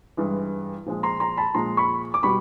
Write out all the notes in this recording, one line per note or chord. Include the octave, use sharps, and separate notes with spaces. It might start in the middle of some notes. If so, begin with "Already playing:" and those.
G2 E3 G#3
A#2 F3 G#3
A#5 C6
A#5 C6
A5 B5
A#2 F3 G#3 A#5 C6
B5 C#6
D6
B2 G3 B5 C#6